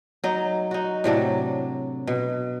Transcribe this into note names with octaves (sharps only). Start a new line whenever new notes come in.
F#3 D#4
D#4 F#4
A2 C3 F#3 D4
B2